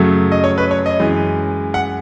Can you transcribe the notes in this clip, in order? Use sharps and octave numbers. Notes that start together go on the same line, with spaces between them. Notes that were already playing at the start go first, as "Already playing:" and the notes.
Already playing: F#2 C#3 F#3 A3
D#5
C#5
B4
C#5
D#5
F#2 E3 G#3
F#5